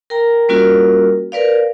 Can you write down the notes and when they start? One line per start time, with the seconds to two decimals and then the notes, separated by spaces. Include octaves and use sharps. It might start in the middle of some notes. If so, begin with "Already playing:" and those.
0.10 A#4 G5 A#5
0.49 G3 A#3 C#4 F4 F#4 A#4
1.32 A#4 B4 D5 F5